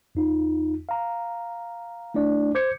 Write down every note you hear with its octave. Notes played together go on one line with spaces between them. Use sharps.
E2 D#4 F4
F5 A#5
A3 D4 E4 D5
C5 D6 G6 G#6 C#7